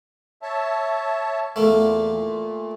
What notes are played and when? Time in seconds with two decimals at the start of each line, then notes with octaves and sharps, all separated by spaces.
0.42 C#5 E5 A5
1.56 E2 A#2 A3 A#3
2.13 A#2